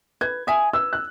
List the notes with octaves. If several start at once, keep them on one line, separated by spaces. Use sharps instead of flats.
B4 G#6
E5 G#5 D#6
B4 E6
F#6